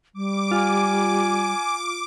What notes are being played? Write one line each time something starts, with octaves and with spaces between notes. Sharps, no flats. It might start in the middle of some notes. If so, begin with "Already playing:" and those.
G3 D6
F4 G#5